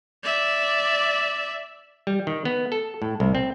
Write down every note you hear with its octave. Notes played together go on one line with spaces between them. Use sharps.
D5 E5
G3
D#3
B3
A4
A2
C2
C4